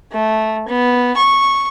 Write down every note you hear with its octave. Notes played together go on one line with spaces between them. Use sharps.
A3
B3
C#6